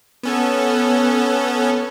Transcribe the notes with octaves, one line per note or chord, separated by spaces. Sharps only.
B3 C#4 A4